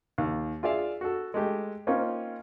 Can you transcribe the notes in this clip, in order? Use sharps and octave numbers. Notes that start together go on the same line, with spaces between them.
D#2
F4 G#4 D5 E5 F5
F#4 A4
G#3 A3 G4
A#3 C4 C#4 D#4 F4